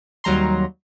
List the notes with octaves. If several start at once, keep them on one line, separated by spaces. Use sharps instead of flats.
D#2 F#3 G3 A#5 C6